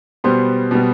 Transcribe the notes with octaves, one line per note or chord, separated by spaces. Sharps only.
B2 G3 B3 C5 C6
B2 G3 B3